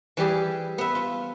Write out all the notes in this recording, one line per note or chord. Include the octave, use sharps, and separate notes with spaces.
E3 G3 G4 G#4
B3 E5
F4